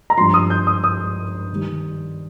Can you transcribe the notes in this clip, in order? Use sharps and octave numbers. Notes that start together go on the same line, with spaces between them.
A#5
G2 F3 C6
D#6
G6
D#6
D#6
D#3 G3